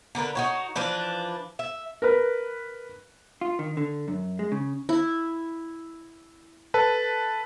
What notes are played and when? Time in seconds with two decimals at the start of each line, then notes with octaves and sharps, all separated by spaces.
0.15 D3 D4 A#4 B4
0.35 D#4 F#4 C#5
0.76 E3 F3 D4 B4
1.59 E5
2.02 A#4 B4
3.41 F4
3.59 D#3
3.77 D3
4.08 F#2
4.39 G#3
4.52 C#3
4.89 E4
6.74 A4 B4 A5